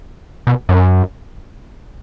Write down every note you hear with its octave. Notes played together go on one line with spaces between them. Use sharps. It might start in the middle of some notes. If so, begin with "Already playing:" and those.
B2
F#2